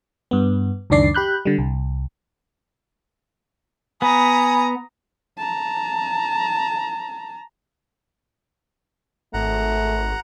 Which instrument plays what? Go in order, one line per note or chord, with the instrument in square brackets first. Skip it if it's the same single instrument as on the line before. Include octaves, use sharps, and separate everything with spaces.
[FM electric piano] G2 B3
C#2 F#2 D#3 D4 D5 C7
G4 B5 F#6 G6
D3 G3
C2
[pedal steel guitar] B3 [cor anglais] G#5 [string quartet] A#5 D#6 [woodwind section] B5
[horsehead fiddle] A5 A#5
[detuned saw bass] G#1 [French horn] A3 [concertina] F#5 A#5